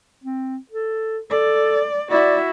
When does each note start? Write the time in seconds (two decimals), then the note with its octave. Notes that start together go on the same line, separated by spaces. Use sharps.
0.24 C4
0.71 A4
1.30 A4 D5
2.11 E4 F#4 D5